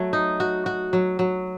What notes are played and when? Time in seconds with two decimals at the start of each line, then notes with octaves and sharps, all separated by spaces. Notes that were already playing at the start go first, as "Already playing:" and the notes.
Already playing: F#3 A3
0.13 D#4
0.40 F#4
0.66 F#4
0.93 F#3
1.19 F#3